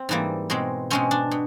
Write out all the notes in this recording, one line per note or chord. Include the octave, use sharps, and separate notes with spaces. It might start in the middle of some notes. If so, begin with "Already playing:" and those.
Already playing: C4
G#2 E3 G3 A#3
B2 G#3 C4
B2 G#3 C4 C#4
D4
B2